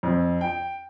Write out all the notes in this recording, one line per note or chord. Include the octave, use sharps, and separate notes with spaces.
F2
G5